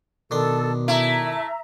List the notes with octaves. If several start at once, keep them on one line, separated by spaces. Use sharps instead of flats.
B2 D#3 D4 A4 C6
A3 E4 E5 A#5